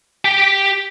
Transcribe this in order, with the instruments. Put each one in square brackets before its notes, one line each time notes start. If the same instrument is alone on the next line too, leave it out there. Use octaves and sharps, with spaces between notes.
[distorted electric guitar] G4 G5